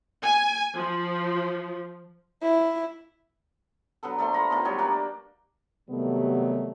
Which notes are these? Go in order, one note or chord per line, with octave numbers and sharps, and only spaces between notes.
G#5
F3
E4
D3 F#3 B3 A4
F3 A3 A#3 C6
F4 A#5 B5
D#3 F3 A3 B3
F#3 G3 D#4 C#5
A#3 D4 D5 G5
C3 D#3 F#3 G3 A3 B3